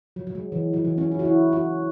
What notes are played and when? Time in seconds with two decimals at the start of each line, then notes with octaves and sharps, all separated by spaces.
0.16 F#3
0.27 F#3
0.35 G#3
0.52 E3
0.73 F#3
0.85 E3
0.98 C#4
1.12 E4
1.19 F#4
1.25 E4
1.53 F#4